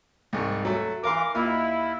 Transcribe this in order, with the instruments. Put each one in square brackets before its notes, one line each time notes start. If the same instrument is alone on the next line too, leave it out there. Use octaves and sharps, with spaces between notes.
[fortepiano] C2 G#2 C#6
F#3 A3
[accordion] E3 D6 [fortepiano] A#4 F5 C6
[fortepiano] D#2 F4 F5 [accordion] E4